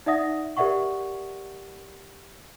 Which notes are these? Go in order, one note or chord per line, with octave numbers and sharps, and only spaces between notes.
D#4 D5 E5 F#5 D#6 A#6
G4 A#4 D5 E5 F#5 C#6